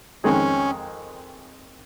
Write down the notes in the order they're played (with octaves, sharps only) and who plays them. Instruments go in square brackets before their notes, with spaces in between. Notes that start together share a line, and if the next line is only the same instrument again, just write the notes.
[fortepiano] F2 D#3 G#3 D#4 G#4 [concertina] C#4